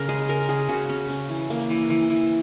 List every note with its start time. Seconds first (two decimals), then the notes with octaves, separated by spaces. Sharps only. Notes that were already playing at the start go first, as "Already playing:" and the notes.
Already playing: C#3 A#4
0.09 G#3 G#4
0.29 C#3 A#4
0.49 C#3 G#4
0.69 C#3 F#4
0.89 C#4
1.09 C#3
1.29 E3
1.50 A#3
1.70 E3
1.90 E3
2.10 E3